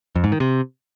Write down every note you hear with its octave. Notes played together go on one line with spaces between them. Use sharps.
F2
G#2
D#3
C3